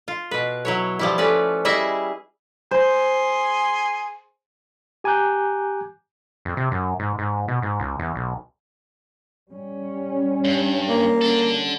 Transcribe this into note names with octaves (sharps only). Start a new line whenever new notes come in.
F4
B2 B4
F#3 E4 C#5
F3 G3 E4
A3 C#4 B4 D5
G3 E4 G#4 D#5 E5
G#4 C5 C6
G4 G#5 A#5 D6 F#6 G6
F2
C3
F#2
G#2
G#2
B2
G#2
C#2
E2
B1
G3 C#4
G2
A#3
D4 A4